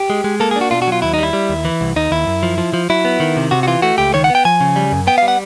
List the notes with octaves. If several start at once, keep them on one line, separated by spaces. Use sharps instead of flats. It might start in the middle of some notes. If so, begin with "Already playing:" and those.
Already playing: G4
G#3
G#3
A#3 A4
G#4
D4
F#4
B2 F4
F#4
F#3 F4
D#2 E4
D#4
G3 E4
G3
D#2
E3
C2
D#2 D#4
D#2 E4
F#2
F3
F3
F3
F#3 E4
B3
D#3
C3
C3 F#4
F#4
E3 F4
A3 F#4
C#2 G4
D#3 C#5
F#5
B3
G5
F3 G#5
C#3
G3
F#2
B3 G5
F5
G3
F#5